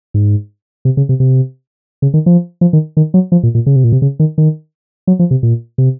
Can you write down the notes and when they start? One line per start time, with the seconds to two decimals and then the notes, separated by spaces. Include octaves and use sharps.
0.14 G#2
0.85 C3
0.97 C#3
1.09 C3
1.20 C3
2.02 C#3
2.14 D#3
2.26 F3
2.61 F3
2.73 D#3
2.97 D#3
3.14 F#3
3.32 F3
3.43 A#2
3.55 A#2
3.66 C#3
3.76 C3
3.84 A#2
3.92 C3
4.02 C#3
4.20 D#3
4.38 D#3
5.07 F#3
5.19 F3
5.31 C3
5.43 A#2
5.78 C3